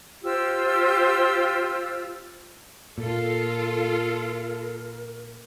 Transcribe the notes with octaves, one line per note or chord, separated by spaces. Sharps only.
F4 G4 C5 E6
A#2 F4 A4 A#4